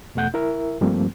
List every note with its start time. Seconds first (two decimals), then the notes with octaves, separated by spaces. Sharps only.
0.15 E2 B2 A3 F#5 G6
0.34 E4 A#4 E5
0.81 G2 F3 G3 A3 A#3 C4